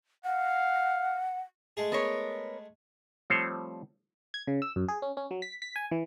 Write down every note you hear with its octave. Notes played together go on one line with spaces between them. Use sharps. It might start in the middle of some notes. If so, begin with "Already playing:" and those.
F5 F#5
G#3 A3 G#4
B3 A#4 C#5
F3 G3 A3 C4 C5 C#5
G#6
C#3
E6
F#2
G#4
C#4
C#4
F#3
B6
B6
G#5
E3